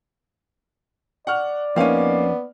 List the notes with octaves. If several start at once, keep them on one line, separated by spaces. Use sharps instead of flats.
D5 F#5 C#6 F6
F2 A#3 B3 C#4 D#4 F5